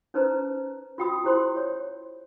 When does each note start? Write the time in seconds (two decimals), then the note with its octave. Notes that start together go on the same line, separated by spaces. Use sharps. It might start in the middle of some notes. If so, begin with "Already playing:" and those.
0.14 C#4 D#4 B4 C5 A#5
0.98 F4 F#4 G5 B5 D#6
1.24 E4 G4 G#4 C5 B5 C6
1.56 C#5